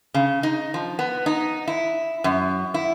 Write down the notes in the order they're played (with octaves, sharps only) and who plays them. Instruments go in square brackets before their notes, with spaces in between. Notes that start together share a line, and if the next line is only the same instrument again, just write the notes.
[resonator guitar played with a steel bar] C#3
D#4
F3
B3
D#4
E4
F#2
E4